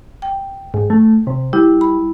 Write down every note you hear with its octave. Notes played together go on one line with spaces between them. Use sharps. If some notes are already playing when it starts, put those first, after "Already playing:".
G5
G#2
A3
C3
G3 E4
B5